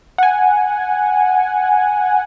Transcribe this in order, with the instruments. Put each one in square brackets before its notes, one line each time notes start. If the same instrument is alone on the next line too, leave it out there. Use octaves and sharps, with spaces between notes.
[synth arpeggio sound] F#5 G#5